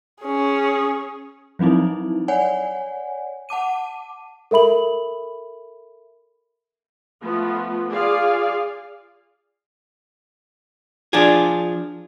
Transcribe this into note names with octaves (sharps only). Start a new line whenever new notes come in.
C#4 G#4
F3 F#3 C4 D#4 E4
C#5 D5 F#5 G#5
F#5 A5 D6 D#7
A4 A#4 E5 B5 F#7
F3 A3 B3
F4 G#4 D5 F5
F3 D4 F4 G#4